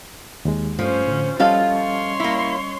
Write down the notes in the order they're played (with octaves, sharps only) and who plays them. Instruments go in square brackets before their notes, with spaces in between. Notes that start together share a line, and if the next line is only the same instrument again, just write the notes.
[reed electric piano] D#2 G#3
[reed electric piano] G2 A3 [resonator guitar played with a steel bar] F3 [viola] C#4 C5
[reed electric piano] A2 D3
[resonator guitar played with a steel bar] F3 A4 F5 [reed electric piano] G3 C#4 D#5 [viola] F4
[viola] C#5 C6
[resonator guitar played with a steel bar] A#3 E4